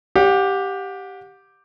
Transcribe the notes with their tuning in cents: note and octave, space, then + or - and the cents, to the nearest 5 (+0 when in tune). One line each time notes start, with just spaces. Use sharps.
G4 +0 C#5 +40 F#5 -35